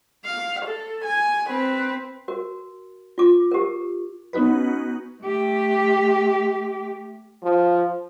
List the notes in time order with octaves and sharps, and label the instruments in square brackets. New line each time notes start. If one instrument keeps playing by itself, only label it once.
[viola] F5
A4
G#5
C4 B4
[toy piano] F#4 A#4
F4 D6
G4 A#4
[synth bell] B3 C#4 D#4 F#4 B4
[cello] A3 G4
[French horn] F3